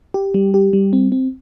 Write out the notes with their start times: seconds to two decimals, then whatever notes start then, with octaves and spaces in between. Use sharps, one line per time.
0.14 G4
0.34 G3
0.54 G4
0.73 G3
0.93 C4
1.12 C4